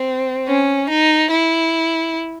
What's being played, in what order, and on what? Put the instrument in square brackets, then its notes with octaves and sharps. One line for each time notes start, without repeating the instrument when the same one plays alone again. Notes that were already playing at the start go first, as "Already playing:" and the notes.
Already playing: [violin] C4
C#4
D#4
E4